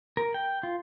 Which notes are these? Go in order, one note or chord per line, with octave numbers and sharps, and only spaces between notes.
A#4
G5
F4